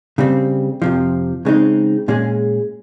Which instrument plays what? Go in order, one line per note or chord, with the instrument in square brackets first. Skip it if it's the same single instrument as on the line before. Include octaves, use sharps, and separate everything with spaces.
[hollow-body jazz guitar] C#3 G3 C4
F2 C3 F3
C#3 G#3 C4 D#4
A#2 G#3 C#4 G#4